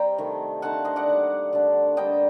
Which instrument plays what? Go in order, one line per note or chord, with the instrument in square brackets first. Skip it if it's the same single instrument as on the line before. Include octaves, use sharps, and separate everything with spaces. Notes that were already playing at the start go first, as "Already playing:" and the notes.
Already playing: [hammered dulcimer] G3 C4 G5 A#5
C3 D#3 A3
D3 A3 C4 D#4 F#5 A5
C5 D#5
D5 F#5
D#3 G3 A#3
D3 A3 D4
D3 G3 A#3 D#5 G5